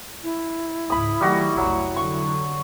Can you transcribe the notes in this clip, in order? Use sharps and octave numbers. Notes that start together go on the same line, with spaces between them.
E4
C#2 G#2 B5 D#6
D#3 F#3 G3 A3 F#4
F1 B1 F#3
D3 F#3 C#6